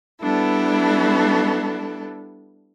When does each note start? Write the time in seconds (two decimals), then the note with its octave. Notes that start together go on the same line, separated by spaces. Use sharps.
0.21 G3 B3 D4 E4 A4